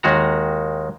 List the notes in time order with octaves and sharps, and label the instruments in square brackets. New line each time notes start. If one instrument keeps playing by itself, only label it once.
[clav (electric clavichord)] D#2 D#3 G#3 F#4 A#5